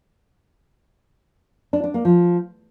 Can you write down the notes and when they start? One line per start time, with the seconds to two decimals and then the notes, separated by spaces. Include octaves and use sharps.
1.73 D4
1.84 D4
1.94 A#3
2.05 F3